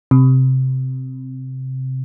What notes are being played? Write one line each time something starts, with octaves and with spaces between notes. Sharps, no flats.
C3